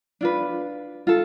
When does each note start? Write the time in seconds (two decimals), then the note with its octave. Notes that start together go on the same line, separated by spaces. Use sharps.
0.21 D4 F4 B4
1.07 F4 A4